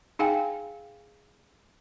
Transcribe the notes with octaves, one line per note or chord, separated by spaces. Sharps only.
D#4 G#4 F5 G5 G#5